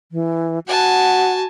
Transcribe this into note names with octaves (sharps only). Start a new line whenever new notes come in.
E3
F#4 F#5 G#5 A5